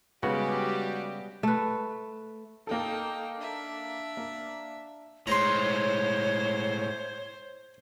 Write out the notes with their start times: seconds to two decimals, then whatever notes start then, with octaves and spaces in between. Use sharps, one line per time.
0.23 C#3 G3 G#3 B3 F#4 G4
1.43 A3 B4
2.67 A#3 D#4 A4 G5
3.38 D4 E5
4.17 A#3
5.27 A2 G#3 C5 C#5 A#5 C6